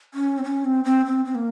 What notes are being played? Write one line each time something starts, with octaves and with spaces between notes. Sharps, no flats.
C#4
C4
C#4
C4
C4
C4
C4
A#3